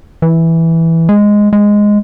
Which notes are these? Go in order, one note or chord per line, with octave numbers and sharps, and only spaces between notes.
E3
G#3
G#3